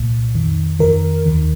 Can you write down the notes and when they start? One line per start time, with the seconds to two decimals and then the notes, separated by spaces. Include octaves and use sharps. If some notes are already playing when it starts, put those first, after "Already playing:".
Already playing: C2 A#2
0.35 F2 D#3
0.79 F2 D#3 A#4
1.25 D#2 D#3